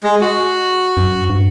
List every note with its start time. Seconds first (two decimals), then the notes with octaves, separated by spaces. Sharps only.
0.03 G#3
0.21 F#4
0.97 F#2
1.29 G2